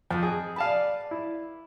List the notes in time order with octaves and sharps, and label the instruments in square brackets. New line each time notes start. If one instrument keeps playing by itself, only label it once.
[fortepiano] F2 [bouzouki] C4 D#4
[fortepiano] G#4
[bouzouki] B4 D5 [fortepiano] F5 A5 B5
[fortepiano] E4